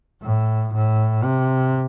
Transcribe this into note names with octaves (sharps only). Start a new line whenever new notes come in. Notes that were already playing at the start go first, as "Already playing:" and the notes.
A2
A2
C3